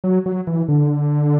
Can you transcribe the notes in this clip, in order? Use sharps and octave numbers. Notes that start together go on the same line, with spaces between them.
F#3
F#3
E3
D3